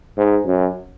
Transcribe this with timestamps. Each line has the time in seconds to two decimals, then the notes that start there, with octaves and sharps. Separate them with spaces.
0.18 G#2
0.47 F#2